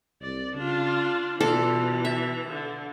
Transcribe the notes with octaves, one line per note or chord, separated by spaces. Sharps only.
C2 D5
C#3 D4 F4
B2 E3 F4 A4 D5
E5
D3